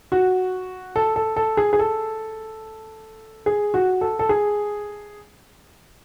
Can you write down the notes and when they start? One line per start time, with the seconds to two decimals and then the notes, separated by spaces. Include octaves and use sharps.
0.12 F#4
0.96 A4
1.16 A4
1.36 A4
1.57 G#4
1.73 G#4
1.79 A4
3.46 G#4
3.74 F#4
4.01 A4
4.19 A4
4.29 G#4